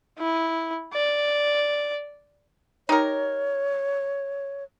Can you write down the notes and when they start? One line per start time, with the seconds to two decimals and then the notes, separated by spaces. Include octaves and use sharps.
0.18 E4
0.93 D5
2.89 D#4 G4 A#4 C#5